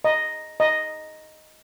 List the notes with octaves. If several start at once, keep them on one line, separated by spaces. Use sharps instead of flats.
D#5
D#5